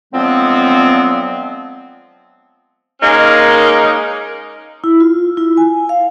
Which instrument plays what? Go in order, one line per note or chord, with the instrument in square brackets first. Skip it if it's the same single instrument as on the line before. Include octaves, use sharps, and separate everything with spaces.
[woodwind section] D3 F3 F#3 G#3 B3 C4
[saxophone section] G#3 A#3 C#4 D#4 A#4
[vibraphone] E4
F4
E4
G#5
F5